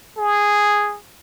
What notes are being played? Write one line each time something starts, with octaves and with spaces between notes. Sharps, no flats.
G#4